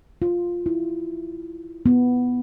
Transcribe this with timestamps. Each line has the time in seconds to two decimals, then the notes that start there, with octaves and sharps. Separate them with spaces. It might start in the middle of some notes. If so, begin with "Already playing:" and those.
0.22 F4
0.66 E4
1.86 B3